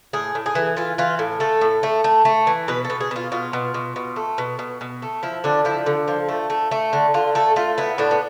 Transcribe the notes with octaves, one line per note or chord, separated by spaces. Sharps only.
A2 G#4
A2
G#4
E3
E3 F4
E3 F4
A2
A3 A4
A2
A3
A3
A3
E3
B2 B4
A4
B2
G#4
B2 F4
B2 F4
B2
B2
B2
A3
B2
B2
B2
A3
F3 E4
D3 D4
F3 E4
D3
F3
A3
A3
A3
D3
D3 F4
A3 A4
A3 F4
B3 E4
A2 D4
B3